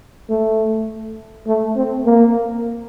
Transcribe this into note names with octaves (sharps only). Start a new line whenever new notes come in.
A3
A3
C4
A#3